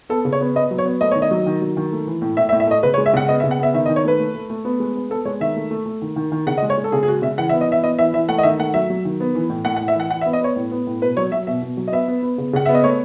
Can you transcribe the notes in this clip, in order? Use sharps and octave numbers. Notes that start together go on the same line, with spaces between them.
B3 A4
C#3
C#5
B3
B3 D#5
F#3
C#5
B3
A3 D#5
D#3 C#5
D#5
F#3
D#3
F#3
D#3
A3
E3
A2
A2 E5
E5
A2
E5
A3 D#5
C#3 B4
C#5
G#3
E5
C#3 F#5
B3 D#5
E5
C#3
F#5
B3 E5
D#3 E5
D#5
D#3
C#5
A3 B4
A3
A3
A3
B3
G#3
B3
B3 A4
G#3 C#5
D#3 E5
A3
A3
A3
D#3
D#3
D#3
C#3 F#5
D#5
G#3
C#5
G#3
A4
C#3 G#4
G#4
G#3 F#4
C#3 E5
E3 F#5
E5
B3
D#5
E3 E5
B3 D#5
E3 E5
E3 E5
A3 F#5
D#5
D#3 E5
A3 F#5
F#3 E5
F#3
D#3
B3
E3
A2
A2 F#5
F#5
A2
E5
E3 F#5
E3 F#5
E5
B3
D#5
B3 C#5
A2
B3
A2
B2 B4
F#3 C#5
F#3 E5
B2 E5
B2
F#3
D#5
B3 E5
B3
B3
C#3
C#3 F#5
B3 E5
D#5
A3 C#5